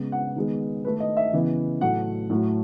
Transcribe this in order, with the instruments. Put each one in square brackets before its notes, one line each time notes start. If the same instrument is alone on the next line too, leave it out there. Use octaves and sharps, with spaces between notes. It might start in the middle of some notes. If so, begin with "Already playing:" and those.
Already playing: [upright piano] C#3 G#3 B3
F#5
D#3 G#3 B3
D#3 A3 B4
D#5
E5
C#3 E3 B3
A2 F#3 A3 F#5
A2 F#3 A3